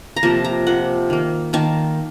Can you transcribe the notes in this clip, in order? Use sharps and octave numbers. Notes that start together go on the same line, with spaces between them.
A#5
C3 F3 A#3 A5
A#5
C3 F3 A#3 F#5
D#3 A#3
D#3 A#3 A5